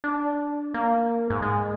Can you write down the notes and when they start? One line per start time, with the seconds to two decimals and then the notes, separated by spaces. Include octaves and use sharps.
0.04 D4
0.74 A#3
1.30 G#2
1.42 G#3